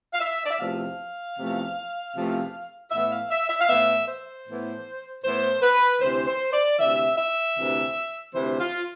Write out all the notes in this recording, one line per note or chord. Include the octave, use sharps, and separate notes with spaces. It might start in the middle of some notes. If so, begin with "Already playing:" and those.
F5
E5
D5
E5
E2 C3 F3 A3 F5
E2 C3 F3 A3
E2 C3 F3 A3
A2 E3 B3 E5
F5
E5
E5
F5
A2 E3 B3 E5
C5
A2 E3 B3
A2 E3 B3 C5
B4
D2 C3 E3 C5
C5
D5
D2 C3 E3 E5
E5
D2 C3 E3
D2 C3 E3 C5
F4